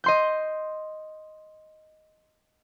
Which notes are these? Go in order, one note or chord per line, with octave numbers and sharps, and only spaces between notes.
D#5 C6 G6